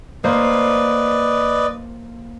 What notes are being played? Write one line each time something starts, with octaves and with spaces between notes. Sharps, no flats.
A#3 B4 C5 D5 D#5